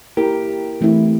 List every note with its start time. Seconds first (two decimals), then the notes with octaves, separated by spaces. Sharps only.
0.17 A#3 E4 G4 A#4
0.81 E3 A3 C4 E4